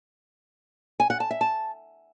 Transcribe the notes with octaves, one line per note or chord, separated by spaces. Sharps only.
G#5
F#5
A5
E5
A5